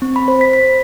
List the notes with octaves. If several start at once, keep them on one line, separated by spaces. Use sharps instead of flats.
C4
B5
C5
B6
B6